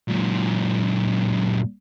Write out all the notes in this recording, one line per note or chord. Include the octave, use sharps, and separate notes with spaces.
F#2 A#2